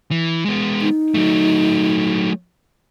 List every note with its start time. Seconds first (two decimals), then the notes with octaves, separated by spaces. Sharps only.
0.11 E3
0.46 G#3 B3
0.82 D#4
1.14 F#3 A3